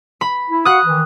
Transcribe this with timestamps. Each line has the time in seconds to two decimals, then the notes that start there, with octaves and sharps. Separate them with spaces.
0.21 B5
0.50 E4
0.65 F#4 F5 F#5 D#6 F#6
0.86 D#3 E3